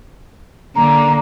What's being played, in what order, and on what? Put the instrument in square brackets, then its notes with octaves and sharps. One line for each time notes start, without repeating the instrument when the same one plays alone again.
[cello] D3 A#3 [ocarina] A#5